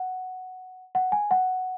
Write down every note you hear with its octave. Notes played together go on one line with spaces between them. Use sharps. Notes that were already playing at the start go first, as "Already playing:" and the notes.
Already playing: F#5
F#5
G#5
F#5